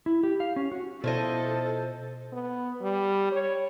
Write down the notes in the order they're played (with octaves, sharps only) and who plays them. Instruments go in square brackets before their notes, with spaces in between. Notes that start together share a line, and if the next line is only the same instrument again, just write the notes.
[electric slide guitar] E4
G4
F5
C#4
F#4
[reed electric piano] B2 [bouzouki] F3 E4 D#5 [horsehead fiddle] A4 [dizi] C5
[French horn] B3
G3
C#5